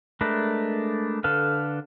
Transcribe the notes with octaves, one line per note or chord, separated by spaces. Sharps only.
G#3 A3 D4 A#4 B4
D3 A4 B4 F5